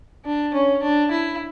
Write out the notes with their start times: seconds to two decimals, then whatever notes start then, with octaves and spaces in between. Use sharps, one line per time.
0.25 D4
0.54 C#4
0.82 D4
1.11 E4